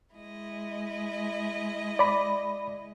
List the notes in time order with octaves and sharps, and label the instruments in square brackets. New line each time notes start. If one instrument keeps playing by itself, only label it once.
[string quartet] G#3 E4 D#5
[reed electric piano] D5 B5